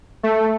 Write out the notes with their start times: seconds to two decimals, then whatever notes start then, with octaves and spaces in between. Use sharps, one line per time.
0.23 A3